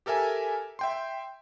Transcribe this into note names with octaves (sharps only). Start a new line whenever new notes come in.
G4 A4 A#4 E5 G#5
E5 G5 C6